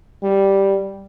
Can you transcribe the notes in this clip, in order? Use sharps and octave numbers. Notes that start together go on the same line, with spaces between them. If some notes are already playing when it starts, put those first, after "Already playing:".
G3